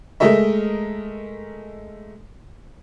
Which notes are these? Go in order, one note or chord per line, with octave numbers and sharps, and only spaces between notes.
G#3 A3 A#4 D#5 E5